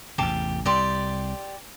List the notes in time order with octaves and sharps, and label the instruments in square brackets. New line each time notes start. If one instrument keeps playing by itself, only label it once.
[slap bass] A1 E2 C3 [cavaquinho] G4 A5 D6
[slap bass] C2 C3 [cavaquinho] G4 D5 C6